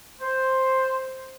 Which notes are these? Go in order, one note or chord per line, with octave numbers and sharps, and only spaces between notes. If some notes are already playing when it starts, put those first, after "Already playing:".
C5